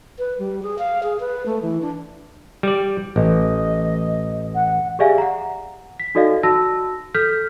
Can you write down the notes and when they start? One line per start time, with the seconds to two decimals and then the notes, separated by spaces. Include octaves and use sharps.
0.19 B4
0.39 G3
0.63 G#4
0.78 F5
1.03 G#4
1.20 B4
1.46 A3
1.62 E3
1.82 D4
2.63 G3 D5
3.16 A1 D#5
4.55 F#5
4.99 G4 G#4 D5 E5 F5 G#5
5.18 F#5 A#5
6.00 B6
6.15 D#4 F#4 A4 D5 D#5 F5
6.43 F#4 A5 E6 A#6
7.14 A4 F6 G6 B6